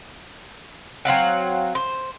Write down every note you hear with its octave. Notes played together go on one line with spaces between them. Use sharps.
F#3 C4 F5 F#5
C5